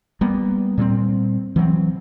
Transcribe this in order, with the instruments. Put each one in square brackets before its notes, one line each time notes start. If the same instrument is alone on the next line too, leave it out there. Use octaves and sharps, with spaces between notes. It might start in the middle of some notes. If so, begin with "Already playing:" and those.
[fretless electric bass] G3 A#3 B3
A#2 G3 A#3 C4
E3 F#3 B3 C4